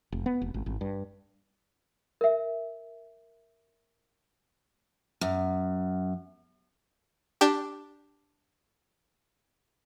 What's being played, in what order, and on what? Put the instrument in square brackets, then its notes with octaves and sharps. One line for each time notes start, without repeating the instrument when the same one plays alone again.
[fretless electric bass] F1
B3
F1
G#1
G#1
G2
[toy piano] A#4 E5
[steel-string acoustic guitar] F#2
[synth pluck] D4 G4